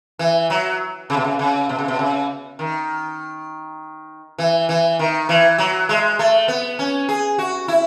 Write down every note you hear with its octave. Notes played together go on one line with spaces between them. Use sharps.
E3
F#3
C#3
B2
C#3
C#3
B2
C#3
B2
C#3
D#3
E3
E3
D#3
E3
F#3
G#3
A3
B3
C#4
G#4
F#4
E4